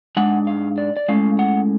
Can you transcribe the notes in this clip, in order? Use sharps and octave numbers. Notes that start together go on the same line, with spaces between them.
G#2 G#3 D4 F#5
F5
D5
D5
A2 G#3 C#4 F5
F#5